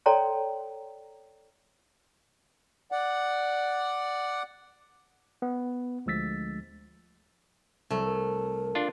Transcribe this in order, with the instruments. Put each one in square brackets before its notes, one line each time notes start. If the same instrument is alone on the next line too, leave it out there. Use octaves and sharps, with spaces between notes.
[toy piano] A4 C#5 D5 G5 A#5 C6
[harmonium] D5 F#5
[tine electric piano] B3
D2 F3 G#3 E6 A6 B6
[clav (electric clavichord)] C2 [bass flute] F#3 [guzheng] A3
[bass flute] A#4
[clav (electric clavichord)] D4 F4